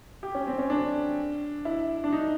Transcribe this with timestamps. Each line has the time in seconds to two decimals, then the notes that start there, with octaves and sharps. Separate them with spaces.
0.23 G4
0.35 C#4
0.47 C4
0.58 C#4
0.70 D4
1.65 E4
2.04 D4
2.12 D#4